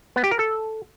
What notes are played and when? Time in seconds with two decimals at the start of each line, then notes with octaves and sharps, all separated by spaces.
0.16 B3
0.24 G4
0.31 A#4
0.39 A4